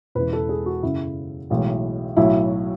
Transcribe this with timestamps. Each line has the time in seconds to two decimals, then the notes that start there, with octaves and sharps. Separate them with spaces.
0.15 E1 E2 C#3 E3 B4
0.33 A4
0.49 G#4
0.66 F#4
0.83 F#1 F#2 C#3 E4
1.50 B1 A2 E3 G#3
2.17 B1 A2 F#3 E4